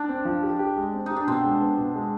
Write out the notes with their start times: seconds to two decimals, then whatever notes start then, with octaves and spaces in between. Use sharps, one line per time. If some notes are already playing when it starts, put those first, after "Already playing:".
Already playing: D4
0.09 C4
0.25 F3
0.43 G4
0.59 G4
0.76 G#3
0.94 C4
1.06 D#4 G4
1.16 D4
1.27 B2 C4
1.44 G#3
1.61 B3
1.78 B2
1.95 G#3